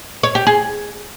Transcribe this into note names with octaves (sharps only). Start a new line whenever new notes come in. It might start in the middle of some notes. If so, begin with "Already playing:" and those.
C#5
G4
G#4